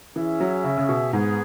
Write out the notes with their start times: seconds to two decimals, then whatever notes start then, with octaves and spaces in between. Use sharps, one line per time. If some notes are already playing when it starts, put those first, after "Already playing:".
0.15 E3 C#4 G#4 E5
0.40 F#3
0.64 C#3
0.78 C#3
0.89 B2
1.13 G#2 B3 G#4